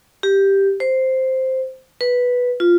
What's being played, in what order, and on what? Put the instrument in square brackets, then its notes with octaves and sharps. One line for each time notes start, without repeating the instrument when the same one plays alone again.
[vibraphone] G4
C5
B4
F4